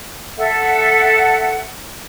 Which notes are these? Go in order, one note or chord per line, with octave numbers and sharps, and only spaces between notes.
A4 E5 F#5